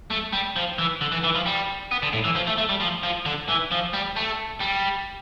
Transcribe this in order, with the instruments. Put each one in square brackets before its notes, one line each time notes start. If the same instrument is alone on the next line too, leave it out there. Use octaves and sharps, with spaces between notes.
[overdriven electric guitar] A3
G3
F3
E3
D3
E3
E3
F3
G3
B3
D3
A2
E3
F3
A3
A3
G3
F3
F3
D3
E3
F3
G3
A3
G3